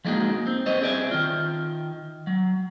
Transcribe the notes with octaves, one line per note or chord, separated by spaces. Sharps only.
F3 G3 G#3 A#3 D#4 F#4
C4
G3 C5 C#5 D#5
C4 G#4 D5 E5
D#3 F4
F#3